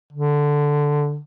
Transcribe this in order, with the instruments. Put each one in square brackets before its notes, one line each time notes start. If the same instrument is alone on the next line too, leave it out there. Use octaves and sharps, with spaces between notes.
[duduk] D3